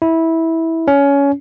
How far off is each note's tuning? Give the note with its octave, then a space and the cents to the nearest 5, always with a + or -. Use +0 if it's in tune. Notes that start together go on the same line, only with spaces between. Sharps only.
E4 -15
C#4 +20